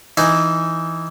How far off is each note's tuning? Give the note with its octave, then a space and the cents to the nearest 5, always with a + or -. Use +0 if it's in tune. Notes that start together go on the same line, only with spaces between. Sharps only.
E3 +0 D#4 +0 G#5 -10